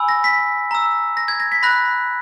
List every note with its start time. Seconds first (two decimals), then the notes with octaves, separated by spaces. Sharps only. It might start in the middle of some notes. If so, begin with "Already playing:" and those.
Already playing: G#5 B5 E6
0.09 A#6
0.24 B6
0.71 A#5 E6
1.17 A#6
1.28 G#6
1.40 A#6
1.52 B6
1.63 B5 F#6 A#6